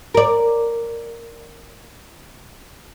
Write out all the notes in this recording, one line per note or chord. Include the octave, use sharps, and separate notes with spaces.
A#4 D5